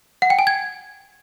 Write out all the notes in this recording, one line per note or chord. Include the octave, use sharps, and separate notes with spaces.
F#5
G5
G#5
G#6